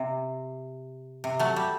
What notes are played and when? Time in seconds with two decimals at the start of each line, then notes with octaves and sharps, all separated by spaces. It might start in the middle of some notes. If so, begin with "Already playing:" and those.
Already playing: C3
1.24 C3
1.39 F#3 A3
1.56 G3